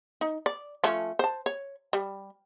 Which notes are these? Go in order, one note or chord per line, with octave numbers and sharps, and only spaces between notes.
D#4
D5
F3 A3 C#4
C5 A5
C#5
G3